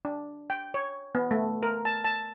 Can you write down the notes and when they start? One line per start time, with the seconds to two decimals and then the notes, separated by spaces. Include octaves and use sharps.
0.05 D4
0.50 G5
0.74 C#5
1.15 B3
1.31 A3
1.63 A#4
1.85 A5
2.05 A5